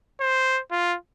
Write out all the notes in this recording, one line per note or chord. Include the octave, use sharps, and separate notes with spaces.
C5
F4